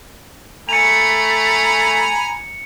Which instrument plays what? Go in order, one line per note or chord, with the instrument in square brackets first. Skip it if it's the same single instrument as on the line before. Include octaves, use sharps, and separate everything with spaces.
[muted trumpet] A3 [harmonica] G#5 A#5 B5 [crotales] C#7 F7